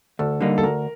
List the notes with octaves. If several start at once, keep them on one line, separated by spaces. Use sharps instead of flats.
D2 A4
D3 G3 A#3 D#4
A4
D2 A#4